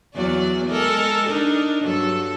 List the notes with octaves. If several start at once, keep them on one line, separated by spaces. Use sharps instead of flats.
E2 F#3 D5
G#3 A4 A#4
D4 D#4 A#4
G2 F#3 A4